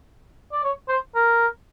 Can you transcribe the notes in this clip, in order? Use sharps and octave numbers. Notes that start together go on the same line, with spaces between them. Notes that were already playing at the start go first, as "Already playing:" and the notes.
D5
C#5
C5
A#4